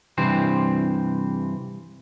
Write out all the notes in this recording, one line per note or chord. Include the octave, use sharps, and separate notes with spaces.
G2 C3 E3 C4 C5